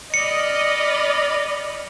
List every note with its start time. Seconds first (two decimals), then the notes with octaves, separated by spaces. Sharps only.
0.14 D5 D#5 B5 F6 C#7